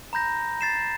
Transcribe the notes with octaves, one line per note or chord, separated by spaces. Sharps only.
A#5 B5 G6 A#6
A6 C7 E7